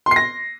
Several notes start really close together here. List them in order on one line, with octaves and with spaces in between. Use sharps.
C6 C7 A#6